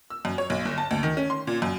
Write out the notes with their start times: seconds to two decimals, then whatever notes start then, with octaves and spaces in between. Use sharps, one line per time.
0.10 E6
0.25 F#2
0.38 C#5
0.50 B1
0.65 G1
0.78 A5
0.91 D2
1.03 D#3
1.17 C#4
1.30 C6
1.47 A#2
1.62 F#2